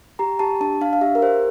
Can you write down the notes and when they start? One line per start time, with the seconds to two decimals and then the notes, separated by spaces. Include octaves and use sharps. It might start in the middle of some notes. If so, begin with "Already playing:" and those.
0.19 G4 A#5
0.39 G4 A5
0.61 D4 A5
0.81 D4 F5
0.93 F5
1.01 G4 E5
1.15 A#4
1.22 G4 C5